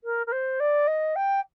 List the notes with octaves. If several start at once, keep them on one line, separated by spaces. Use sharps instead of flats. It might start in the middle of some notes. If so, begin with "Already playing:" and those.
A#4
A#4
C5
D5
D#5
G5